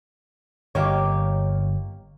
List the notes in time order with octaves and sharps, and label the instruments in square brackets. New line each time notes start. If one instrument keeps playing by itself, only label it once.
[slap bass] G1 [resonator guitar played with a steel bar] A#3 D#4 G4 [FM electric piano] C#5 F5